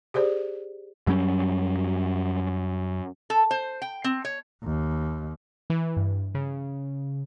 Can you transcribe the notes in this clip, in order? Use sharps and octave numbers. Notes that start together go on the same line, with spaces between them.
G4 G#4 C5 D5
F#2 F#3 G3 C#4
A4
C5
G5
C4
C#5
D#2
E3
G2
C#3